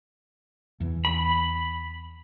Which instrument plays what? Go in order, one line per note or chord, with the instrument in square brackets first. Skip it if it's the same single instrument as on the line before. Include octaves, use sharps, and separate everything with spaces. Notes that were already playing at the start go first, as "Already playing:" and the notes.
[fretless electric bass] E2 E3
[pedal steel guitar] B5